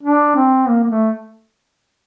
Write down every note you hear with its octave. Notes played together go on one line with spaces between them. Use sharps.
D4
C4
A#3
A#3
A3